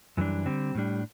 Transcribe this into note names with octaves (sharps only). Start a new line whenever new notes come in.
F#2 E3 G3 D4
D3 G3 C4
A2 G3 D4